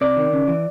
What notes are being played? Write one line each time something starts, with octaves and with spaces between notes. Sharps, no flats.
C3 D5
D#3
C#3
E3